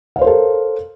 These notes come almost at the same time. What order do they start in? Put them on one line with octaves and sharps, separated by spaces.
F5 C#5 C5 A#4 A4